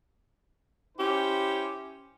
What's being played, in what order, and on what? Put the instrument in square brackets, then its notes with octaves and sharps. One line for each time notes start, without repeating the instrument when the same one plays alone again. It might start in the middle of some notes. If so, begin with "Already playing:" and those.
[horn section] C#4 E4 G4 C5